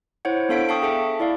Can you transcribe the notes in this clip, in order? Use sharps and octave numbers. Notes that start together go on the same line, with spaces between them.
E4 C5 C#5 F#5
B3 D4 A4 F5 B6 D7
F5 G5 A5 C#6 D#6
G#4 A4 E5 C#7
E4 D5 F5